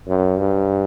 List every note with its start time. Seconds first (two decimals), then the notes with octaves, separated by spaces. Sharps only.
0.08 F#2
0.38 G2